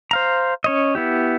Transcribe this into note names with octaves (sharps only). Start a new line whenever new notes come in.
C5 F5 A#5
C#4 C#5 D#5
B3 E4 G4